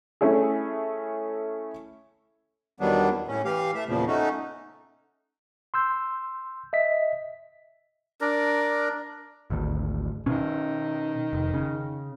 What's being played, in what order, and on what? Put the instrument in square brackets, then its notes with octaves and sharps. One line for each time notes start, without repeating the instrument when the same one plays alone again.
[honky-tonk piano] A3 C#4 E4 G#4
[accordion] E2 D#3 F#3 G3 B3 D4
A2 C#4
E3 G4 F5
A3 E5
E2 A#2 C#3 F3
A3 C#4 D#4 F#4
[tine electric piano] C6 E6 G6
D#5 E5 B6
[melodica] D4 A#4
[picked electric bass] G#1 D2
[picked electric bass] B2 C#4 [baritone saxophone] D#3
[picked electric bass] F1
C#3